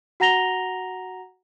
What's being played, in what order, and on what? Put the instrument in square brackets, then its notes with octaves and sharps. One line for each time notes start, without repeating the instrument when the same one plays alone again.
[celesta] F#4 F#5 A#5 A#6 F7 G7